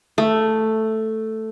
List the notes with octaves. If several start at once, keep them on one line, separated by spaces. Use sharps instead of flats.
A3